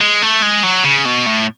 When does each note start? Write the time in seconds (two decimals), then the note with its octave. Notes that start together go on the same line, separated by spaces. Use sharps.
0.01 G#3
0.22 A3
0.42 G#3
0.64 F#3
0.85 C#3
1.06 B2
1.27 A2